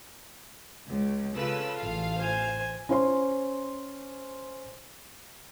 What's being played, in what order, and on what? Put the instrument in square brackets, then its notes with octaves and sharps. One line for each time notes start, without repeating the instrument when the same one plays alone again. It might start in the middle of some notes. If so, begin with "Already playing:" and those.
[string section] C#2
[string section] C#3 B4 E6 [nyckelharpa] F4 A4
[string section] A1 F5
[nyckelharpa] C5 G#5
[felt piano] C#4 C5 C6